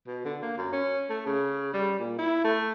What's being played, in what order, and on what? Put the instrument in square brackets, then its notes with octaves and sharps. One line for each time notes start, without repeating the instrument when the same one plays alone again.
[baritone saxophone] B2
D3
A#3
F#2
C#4
A3
C#3
G3
A#2
E4
A3